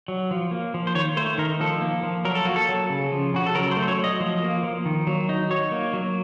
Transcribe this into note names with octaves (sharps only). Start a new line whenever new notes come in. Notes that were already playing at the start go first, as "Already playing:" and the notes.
F#3
F3
A#3
F3
C5
D#3 C#5
A3 C5
D#3 A#4
F3 A4
A#3
F3
F#3 A#4
A4
A#3 F#4
A4
F#3
C#3
F3
C#3 F#4
A4
F#3 A#4
C5
A3
C5
C#5
F#3 D#5
F3
A#3
F3
D#3
F#3
D#4
F#3 C#5
A#3
F#3